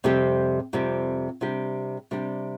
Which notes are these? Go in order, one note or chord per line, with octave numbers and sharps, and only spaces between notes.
F2 C3 G3 C4 G4
F2 C3 G3 C4 G4
C3 G3 D4 G4
C3 G3 D4 G4